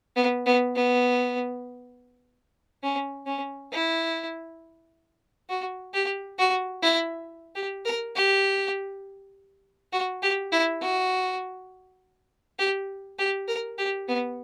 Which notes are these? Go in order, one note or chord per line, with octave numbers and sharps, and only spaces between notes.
B3
B3
B3
C#4
C#4
E4
F#4
G4
F#4
E4
G4
A#4
G4
F#4
G4
E4
F#4
G4
G4
A#4
G4
B3